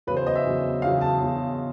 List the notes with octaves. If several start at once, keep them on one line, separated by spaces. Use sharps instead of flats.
E2 C#3 F#3 B4
C5
D#5
E5
E2 C#3 F#3
E2 C#3 F#3 F5
A5
E2 C#3 F#3